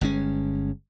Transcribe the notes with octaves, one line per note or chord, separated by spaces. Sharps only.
G1 G#3 C#4